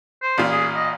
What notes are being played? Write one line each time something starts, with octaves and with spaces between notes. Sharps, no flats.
C5
A1 A#2
G#4
D#5